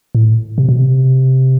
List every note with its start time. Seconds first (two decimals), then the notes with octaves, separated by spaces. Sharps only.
0.15 A2
0.58 C3
0.69 B2
0.79 C3